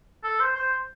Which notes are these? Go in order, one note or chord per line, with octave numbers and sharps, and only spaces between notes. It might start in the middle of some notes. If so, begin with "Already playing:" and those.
A4
C5
C5